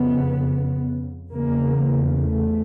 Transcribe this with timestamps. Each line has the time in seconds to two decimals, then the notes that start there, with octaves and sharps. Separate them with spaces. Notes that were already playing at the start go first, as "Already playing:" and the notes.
Already playing: F2 C#3 B3
1.33 E2 C#3 A#3
2.20 A3